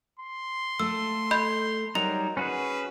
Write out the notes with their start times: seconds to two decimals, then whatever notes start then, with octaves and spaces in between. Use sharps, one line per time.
0.19 C6
0.80 A3 F4 A4 E6
1.31 D#5 B5 G6
1.95 F#3 G3 D#4 A#4 F7
2.37 C#4 F#4 G#4 B4